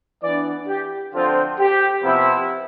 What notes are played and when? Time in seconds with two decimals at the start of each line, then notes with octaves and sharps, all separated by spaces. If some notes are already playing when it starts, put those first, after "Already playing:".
0.22 E3 B3 D4 D5
0.68 G4
1.13 D3 F3 C4 F4
1.59 G4
2.03 C3 F3 B3 E4